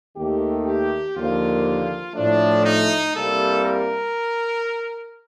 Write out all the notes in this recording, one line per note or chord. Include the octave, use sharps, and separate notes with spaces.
D#2 D#3 A3 G4
G4
D#2 D3 F3 A#3 F4
A2 F3 A3 D4
D#4
C2 C3 G3 A#3 A4
A#4